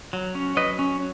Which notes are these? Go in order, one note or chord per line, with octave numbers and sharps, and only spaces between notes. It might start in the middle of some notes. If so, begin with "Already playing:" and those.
F#3
C#4
F#3 B4 D#5
C#4